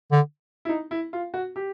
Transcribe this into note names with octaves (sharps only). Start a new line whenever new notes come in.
D3
E4
D#4
E4
F4
F#4
G4